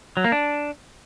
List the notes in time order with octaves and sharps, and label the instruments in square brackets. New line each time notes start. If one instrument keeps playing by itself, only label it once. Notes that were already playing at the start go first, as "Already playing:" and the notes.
[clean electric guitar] F#3
A#3
D4